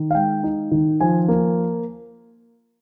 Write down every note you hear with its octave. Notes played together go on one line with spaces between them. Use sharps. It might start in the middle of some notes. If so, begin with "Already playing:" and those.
Already playing: D#3
F5
G#3 G5
D#4
D#3
F3 G#5
A#3